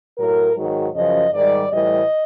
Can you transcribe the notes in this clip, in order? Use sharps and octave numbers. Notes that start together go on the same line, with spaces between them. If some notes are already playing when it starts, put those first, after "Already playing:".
A2 F#3 A#4
G#2 D#3 F#3
F#2 C#3 F3 D#5
G#2 D#3 G3 D5
A2 E3 G3 D#5